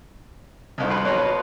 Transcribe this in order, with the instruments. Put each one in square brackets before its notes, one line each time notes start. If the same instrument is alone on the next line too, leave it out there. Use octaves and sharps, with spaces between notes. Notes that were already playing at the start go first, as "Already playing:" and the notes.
[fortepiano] C2 F2 D#3
[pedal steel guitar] F4 B4
[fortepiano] F2 B2 F#3 [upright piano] C#5